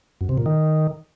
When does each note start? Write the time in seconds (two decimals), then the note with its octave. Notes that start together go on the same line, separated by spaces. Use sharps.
0.21 F#2
0.29 C3
0.38 A#2
0.46 D#3